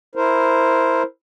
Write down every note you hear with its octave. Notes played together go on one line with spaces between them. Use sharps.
E4 A#4 C5